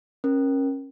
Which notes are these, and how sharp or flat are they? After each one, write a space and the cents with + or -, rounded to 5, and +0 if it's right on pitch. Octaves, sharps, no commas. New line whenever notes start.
C#4 -25 A#4 +20